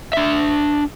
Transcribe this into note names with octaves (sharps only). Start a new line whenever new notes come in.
D4 E5